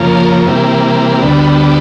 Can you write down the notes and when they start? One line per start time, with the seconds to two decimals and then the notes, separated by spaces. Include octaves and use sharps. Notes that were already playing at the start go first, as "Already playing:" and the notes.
Already playing: F2 C#3 F3 A#3
0.46 C3 E3 G3 A#3
1.21 D2 D3 G3 B3